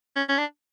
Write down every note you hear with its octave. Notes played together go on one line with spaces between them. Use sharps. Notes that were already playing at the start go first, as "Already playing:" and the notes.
C#4
C#4
D4